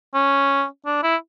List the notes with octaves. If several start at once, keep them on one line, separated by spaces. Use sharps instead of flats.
C#4
D4
E4